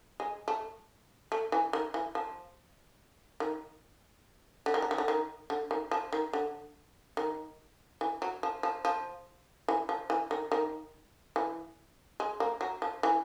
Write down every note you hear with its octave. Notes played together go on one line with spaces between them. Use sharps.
G#3
A3
A3
E3
D#3
E3
F3
D#3
D3
D#3
D3
D#3
D3
D#3
D3
D#3
F3
D#3
D3
D#3
E3
F#3
F3
F3
F3
E3
F3
E3
D#3
D#3
E3
G#3
A#3
F#3
F3
E3